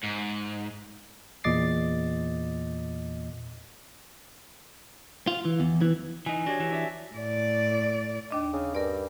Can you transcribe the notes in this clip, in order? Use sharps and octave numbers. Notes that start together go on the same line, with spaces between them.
G#2
E2 A#2 D#5 D6 A6 C7
F4
E3
E2
E3
E3 D#4 G#5
D4 F#4 G4 C#5 A#6
E3
D4 D5 E5
A2 D5
D#2 D4 D#5
C#3
G2 A#4 D5